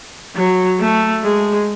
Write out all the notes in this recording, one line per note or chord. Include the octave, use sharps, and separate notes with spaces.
F#3
A3
G#3